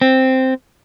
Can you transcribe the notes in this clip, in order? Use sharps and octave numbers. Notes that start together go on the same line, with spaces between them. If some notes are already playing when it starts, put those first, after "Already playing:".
C4